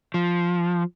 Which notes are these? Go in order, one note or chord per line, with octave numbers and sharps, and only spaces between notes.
F3